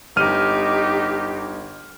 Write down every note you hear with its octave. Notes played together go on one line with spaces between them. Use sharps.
G1 D#4 G4 F6 D#7